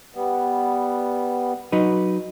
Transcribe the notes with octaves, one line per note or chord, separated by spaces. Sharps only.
G3 B3
F#3 D#4 B4